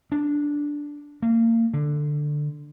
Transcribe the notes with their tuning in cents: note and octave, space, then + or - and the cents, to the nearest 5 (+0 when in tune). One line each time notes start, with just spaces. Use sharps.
D4 -5
A#3 -30
D3 +10